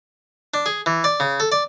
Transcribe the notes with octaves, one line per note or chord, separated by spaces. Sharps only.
D4
G#4
E3
D5
C#3
A4
D5